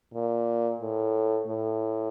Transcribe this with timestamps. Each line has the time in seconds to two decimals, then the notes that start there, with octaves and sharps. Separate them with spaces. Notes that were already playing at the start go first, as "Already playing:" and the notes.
0.14 A#2
0.81 A2
1.48 A2